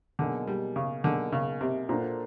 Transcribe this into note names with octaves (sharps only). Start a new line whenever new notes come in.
B2 D3 F#3 A#3 D#4 G#4
G3
C#3
B2 D3 F#3 A#3 D#4 G#4
C#3
C3
A#2 A#3 D4 F#4 A4 C5